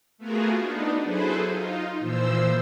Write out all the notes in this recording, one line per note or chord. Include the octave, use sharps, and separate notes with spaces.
A3 B3 F4 F#4 G#4 A#4
B3 D4 D#4
F#3 E4 G#4 A4 B4 C5
D#4 F4
A#2 E3 F3 C5 E6